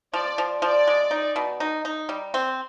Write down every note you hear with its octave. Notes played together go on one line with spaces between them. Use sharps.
F3 D5
F3
F3 D5
G#3
D#4
B2
D#4
D#4
G3
C4